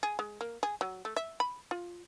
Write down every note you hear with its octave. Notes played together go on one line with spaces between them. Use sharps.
G#4
G#3
A#3
G#4
F#3
A3
E5
B5
F4